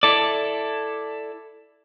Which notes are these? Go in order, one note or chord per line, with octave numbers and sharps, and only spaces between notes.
E4 A4 D5